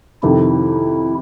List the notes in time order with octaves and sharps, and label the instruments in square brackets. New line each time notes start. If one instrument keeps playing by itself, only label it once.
[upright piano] F2 C3 D#3 [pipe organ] E4